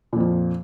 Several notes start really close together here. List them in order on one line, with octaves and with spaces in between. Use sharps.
A#2 F2 F3